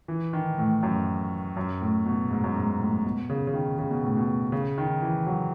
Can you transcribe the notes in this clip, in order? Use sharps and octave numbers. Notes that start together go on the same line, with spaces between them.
E3
D#3
A2
F#2
F#2
A2
B2
G#2
F#2
G#2
A2
B2
C#3
C#3
D#3
C#3
B2
A2
B2
C#3
D#3
E3
F#3